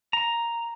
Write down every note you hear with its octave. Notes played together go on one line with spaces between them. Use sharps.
A#5